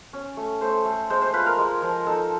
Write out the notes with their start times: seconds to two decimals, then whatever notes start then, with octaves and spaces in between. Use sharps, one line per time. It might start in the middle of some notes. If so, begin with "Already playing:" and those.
0.13 C#4
0.37 A3
0.61 A3 C5
0.85 A3
1.10 G#3 C5
1.22 C5
1.33 F4 B4
1.46 A#4
1.58 G#3
1.82 F3
2.06 D#4 A4